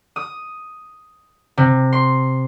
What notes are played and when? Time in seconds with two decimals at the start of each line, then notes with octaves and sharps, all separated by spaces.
0.16 D#6
1.57 C3
1.92 C6